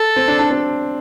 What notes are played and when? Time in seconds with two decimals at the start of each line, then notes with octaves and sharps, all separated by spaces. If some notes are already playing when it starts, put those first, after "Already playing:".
Already playing: A4
0.16 C4
0.28 D4
0.39 D4
0.51 C4